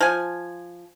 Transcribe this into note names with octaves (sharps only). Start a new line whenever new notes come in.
F3 G#5